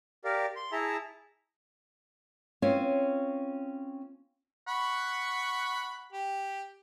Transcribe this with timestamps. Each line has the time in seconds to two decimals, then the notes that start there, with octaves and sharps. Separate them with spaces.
0.25 G4 A#4 D5 F5
0.56 C6
0.72 E4 G#4 E5 A5 A#5
2.62 C4 C#4 F4 B4 C#5
4.67 F#5 B5 C#6
6.13 G4